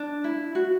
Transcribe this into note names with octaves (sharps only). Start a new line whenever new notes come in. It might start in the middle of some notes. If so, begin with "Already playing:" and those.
Already playing: D4
E4
F#4